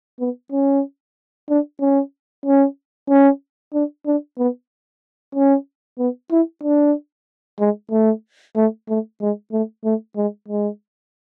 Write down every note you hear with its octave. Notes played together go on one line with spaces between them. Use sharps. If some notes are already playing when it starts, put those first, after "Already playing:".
B3
C#4
D4
C#4
C#4
C#4
D4
D4
B3
C#4
B3
E4
D4
G#3
A3
A3
A3
G#3
A3
A3
G#3
G#3